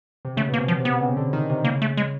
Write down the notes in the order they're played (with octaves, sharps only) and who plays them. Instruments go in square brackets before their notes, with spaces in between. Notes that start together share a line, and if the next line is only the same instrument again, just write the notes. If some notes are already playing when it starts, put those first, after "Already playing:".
[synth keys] C3
[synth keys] C#3 [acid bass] A3
[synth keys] B2
[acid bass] A#3
[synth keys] C3
[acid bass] F3
[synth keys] C3
[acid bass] B3
[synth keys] C3
C#3
D3
D#3
C3
[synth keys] C#3 [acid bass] A#3
[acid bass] A3
G#3